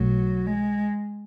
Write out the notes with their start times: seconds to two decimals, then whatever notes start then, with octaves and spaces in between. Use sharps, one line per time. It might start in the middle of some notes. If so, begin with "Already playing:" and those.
Already playing: B1 B2 F#3 A3
0.46 G#3